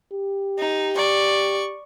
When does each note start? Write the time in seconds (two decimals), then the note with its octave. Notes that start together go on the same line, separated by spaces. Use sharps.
0.14 G4
0.58 D#4
0.97 D5 C#6